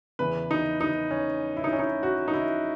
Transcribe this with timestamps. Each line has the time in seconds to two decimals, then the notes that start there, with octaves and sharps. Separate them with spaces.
0.19 E2 C#3 E3 B4
0.51 D#4
0.81 D#4
1.11 C#4
1.57 E4
1.64 D#4
1.73 C#4
1.79 D#4
2.03 F#4
2.28 D#4
2.34 E4